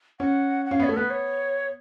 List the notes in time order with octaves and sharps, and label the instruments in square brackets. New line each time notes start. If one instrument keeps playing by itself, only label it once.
[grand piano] C#4 [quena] F#5
[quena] F#5
[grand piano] C#4 [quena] F5
[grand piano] B3
[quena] C#5
[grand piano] A3 [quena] A4
[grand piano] B3 [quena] B4
[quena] C#5